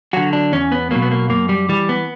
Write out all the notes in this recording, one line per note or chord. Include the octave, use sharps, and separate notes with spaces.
D3 F#3 F#4
D4
E2 C#4
B3
B2 F#3 A#3
B3
A#3
F#2 A#3
G3
E3 G3
B3